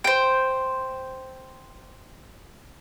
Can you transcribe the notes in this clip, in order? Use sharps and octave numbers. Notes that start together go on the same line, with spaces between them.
C5 G5